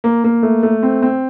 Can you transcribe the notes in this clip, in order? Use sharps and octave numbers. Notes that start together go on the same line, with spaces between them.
A#3
A#3
A3
A3
C4
C4